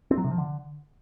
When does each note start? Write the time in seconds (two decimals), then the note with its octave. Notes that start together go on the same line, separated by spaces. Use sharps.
0.11 C4
0.18 F#3
0.24 C3
0.31 F3
0.38 D3